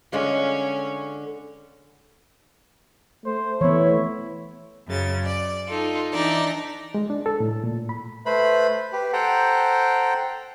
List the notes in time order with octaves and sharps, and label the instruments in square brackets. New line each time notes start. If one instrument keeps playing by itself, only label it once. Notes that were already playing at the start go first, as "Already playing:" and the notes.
[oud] D3 G#3 F4 [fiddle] C#4
[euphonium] A3 [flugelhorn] C5
[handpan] E3 B3 [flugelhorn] E4 [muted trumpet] C#5
[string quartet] F#2 C#3 A6
D5
D#4 F4 A4
E3 D4 D#4 D5
[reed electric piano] G#3
D4
A4
A2
A#2
B5
[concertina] A3 B4 C5 B5
G4 B4
A4 C5 F#5 G5 A#5